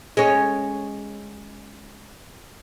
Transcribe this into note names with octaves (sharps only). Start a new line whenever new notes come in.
G#3 C#4